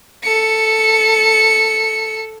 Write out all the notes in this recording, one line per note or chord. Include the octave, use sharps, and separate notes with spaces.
A4 C#7